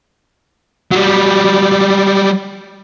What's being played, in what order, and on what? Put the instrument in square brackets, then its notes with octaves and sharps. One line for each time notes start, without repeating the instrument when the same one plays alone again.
[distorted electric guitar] F#3 G3